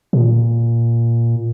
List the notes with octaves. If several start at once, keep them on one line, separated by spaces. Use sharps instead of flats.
A#2